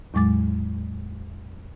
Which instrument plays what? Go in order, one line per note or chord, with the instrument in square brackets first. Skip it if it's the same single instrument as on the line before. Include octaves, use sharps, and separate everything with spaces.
[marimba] E2 A2 F#3 G#3 D6 A6